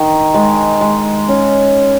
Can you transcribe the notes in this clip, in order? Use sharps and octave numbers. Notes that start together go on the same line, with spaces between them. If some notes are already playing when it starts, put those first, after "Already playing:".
Already playing: D#3
G#3
G#3
C#4